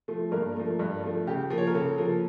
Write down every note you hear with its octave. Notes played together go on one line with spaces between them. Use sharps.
F3 A3
G2 A#3 A#4
F3 A3
G2
F3 A3
C#3 G4
F3 A#3
C#5
A#4
C#3 A4
F3 A#3